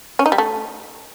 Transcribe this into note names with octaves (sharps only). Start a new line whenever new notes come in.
C#4
D#4
G3
A3